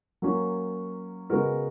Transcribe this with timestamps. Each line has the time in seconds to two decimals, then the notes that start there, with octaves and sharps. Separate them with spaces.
0.22 F#3 A#3 C#4 F#4
1.30 C#3 G#3 B3 F#4 A#4